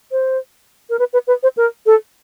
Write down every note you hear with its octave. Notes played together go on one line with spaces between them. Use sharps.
C5
A#4
B4
B4
B4
C5
A#4
A4